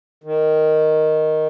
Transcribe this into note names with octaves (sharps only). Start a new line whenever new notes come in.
D#3